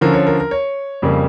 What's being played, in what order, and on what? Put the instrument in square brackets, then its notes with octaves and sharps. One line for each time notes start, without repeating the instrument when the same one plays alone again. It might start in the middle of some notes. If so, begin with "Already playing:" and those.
[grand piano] D3 F3 C#4 A#4
C#5
A#4
A#4
C#5
F2 C#3 G3 A#3